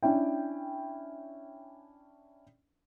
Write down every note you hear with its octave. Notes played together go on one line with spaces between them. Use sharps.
C#4 D4 E4 G5